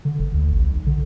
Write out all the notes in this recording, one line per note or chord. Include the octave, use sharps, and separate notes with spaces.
D3
F#1
D2
A1
B1
D3